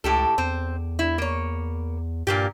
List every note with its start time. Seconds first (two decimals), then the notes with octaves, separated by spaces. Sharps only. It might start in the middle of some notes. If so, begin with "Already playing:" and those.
0.04 C#2 A2 G4 A4
0.38 E2 C4
0.99 E4
1.18 A#3 C#5
2.27 G2 A#2 A#3 G4